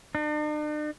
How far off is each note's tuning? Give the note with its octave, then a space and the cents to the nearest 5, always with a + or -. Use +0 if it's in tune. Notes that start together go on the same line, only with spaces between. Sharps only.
D4 +45